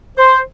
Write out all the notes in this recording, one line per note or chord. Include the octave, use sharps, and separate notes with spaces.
C5